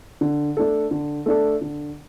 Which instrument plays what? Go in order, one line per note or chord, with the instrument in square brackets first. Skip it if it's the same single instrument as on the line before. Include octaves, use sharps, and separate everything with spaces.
[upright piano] D3
A3 D4 A4
D3
A3 D4 A4
D3